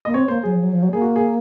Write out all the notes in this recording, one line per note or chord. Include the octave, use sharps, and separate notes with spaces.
A#3 D#5
C4 C#5
A#3 C5
F#3 G#4
F3
F#3
F3
F#3
A#3 G#4
F#4
G#4